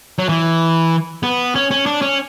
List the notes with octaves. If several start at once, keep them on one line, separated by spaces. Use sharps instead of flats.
F#3
E3
B3
C#4
C#4
D4
C#4